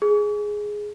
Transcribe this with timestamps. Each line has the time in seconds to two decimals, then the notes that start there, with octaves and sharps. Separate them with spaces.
0.02 G#4